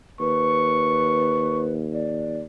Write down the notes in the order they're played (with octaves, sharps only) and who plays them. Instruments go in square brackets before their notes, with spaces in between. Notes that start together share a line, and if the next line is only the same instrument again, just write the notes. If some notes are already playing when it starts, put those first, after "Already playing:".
[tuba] D#2 [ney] B4 [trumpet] C#6
[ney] D5